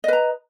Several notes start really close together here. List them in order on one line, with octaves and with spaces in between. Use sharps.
D#5 B4 A#5